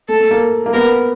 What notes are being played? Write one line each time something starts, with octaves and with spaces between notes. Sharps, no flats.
A3 A4
A3
A#3
A#3
B3 A#4